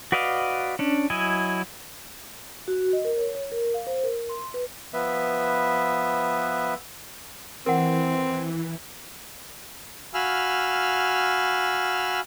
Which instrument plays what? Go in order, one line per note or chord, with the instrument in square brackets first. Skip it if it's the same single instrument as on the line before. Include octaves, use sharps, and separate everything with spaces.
[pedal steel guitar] F#4 B4 D5 D#5 F5
C#4 D4
F#3 E4 D#5 G#5
[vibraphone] F#4
D#5
A#4
C#5
C#5
A#4
F5
C5
A#4
C6
B4
[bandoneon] F3 B3 B4 E5
[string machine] E3 [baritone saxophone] C4 [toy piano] A#4 F#5
[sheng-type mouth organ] F#4 F5 G#5 B5 E6 F6